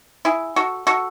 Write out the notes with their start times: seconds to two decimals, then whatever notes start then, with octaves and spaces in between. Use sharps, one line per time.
0.25 E4 G#4
0.56 F#4 A4
0.87 F#4 A4